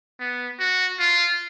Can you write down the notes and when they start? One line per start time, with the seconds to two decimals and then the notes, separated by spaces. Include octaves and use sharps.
0.20 B3
0.59 F#4
0.99 F4